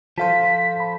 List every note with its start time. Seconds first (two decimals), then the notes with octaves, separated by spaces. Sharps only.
0.18 F3 A4 C5 F5 A5 B6
0.80 B5